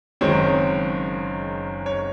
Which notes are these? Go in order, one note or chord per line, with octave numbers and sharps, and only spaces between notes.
F#1 F#2 D#3 G#3 C4 C#5
C#5